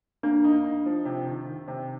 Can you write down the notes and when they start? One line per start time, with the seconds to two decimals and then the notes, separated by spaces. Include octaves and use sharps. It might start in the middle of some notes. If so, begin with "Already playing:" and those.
0.23 A#3 D4
0.44 D#4
0.64 D#4
0.86 F3
1.05 C3
1.27 D#3
1.47 D#3
1.68 C3